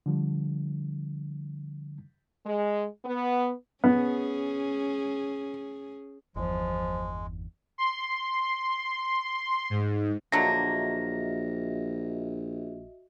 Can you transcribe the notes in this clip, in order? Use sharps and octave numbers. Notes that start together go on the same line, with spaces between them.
D3 F3 G3
G#3
B3
B3 C#4 G#4
G1 E2 F3 G#3
C6
G#2
A#1 D3 F#3 A#3 F#4 D#5 E5 A#6